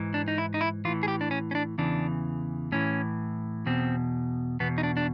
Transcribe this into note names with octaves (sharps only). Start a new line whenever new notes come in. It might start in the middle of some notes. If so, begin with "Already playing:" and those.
Already playing: G#2 E3
D4
D#4
E4
D#4
E4
A2 E3 F4
G#4
G4
D4
C#4
C#4
D4
E2 C#3 E3 D4
A2 E3 C#4
E2 B2 C4
E2 B2 B3
D#4
D4
D4